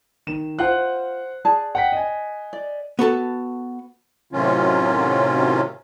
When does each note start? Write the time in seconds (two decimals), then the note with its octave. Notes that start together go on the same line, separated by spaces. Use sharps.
0.27 D#3 E7
0.59 F4 C5 F#5 F#6
1.45 G#4 D5 A5
1.75 F#5 G5 B6
1.92 D#5 G#5
2.53 D5
2.99 B3 F#4 A4 A5
4.33 A2 C3 D#3 F#3 C#4 F4